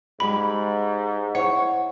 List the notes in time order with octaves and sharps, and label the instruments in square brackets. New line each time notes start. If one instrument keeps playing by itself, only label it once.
[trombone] G#2 [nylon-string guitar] G#3 G4 D5 [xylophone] B5
[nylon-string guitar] E4 C5 [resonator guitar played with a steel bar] C#5 [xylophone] F#5